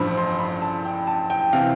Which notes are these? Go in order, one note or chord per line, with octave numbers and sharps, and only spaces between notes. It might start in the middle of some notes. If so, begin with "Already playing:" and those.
Already playing: A1 G2 F3 B5
C6
B5
A5
G5
A5
G5
C3 E3 F5